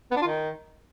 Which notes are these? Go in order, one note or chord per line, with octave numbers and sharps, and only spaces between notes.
B3
D4
F4
D#3